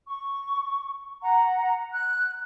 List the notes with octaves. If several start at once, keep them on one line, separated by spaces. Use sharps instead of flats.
C#6
F#5 A#5
F#6